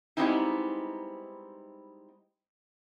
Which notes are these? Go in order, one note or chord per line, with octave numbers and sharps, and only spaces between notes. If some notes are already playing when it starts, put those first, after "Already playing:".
G3 G#3 B3 C4 D#4 E4